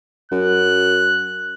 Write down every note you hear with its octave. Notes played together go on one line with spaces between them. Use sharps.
F#2 F#6